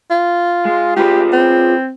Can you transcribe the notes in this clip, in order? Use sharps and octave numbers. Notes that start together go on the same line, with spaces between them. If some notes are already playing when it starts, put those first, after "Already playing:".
F4
G#3
F4 G4 G#4 B4
C4